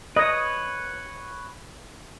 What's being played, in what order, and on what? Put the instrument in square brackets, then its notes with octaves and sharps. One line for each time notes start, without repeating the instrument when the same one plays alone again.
[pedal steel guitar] B4 C#5 [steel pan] D#5